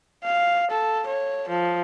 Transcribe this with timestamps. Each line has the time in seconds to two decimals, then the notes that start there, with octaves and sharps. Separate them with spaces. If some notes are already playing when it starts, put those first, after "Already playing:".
0.24 F5
0.71 A4
1.06 C#5
1.48 F3